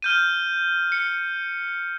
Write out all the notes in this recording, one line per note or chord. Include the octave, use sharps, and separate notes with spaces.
F6 G6 D#7
C#7